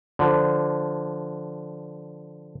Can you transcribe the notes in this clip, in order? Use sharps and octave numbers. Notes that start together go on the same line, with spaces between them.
D3 F3